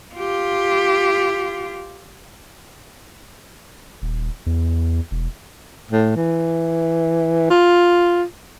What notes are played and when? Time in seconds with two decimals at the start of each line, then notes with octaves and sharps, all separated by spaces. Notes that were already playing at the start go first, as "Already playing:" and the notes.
0.15 F4 G4
4.02 D#1
4.46 E2
5.11 E1
5.91 A2
6.17 E3
7.50 F4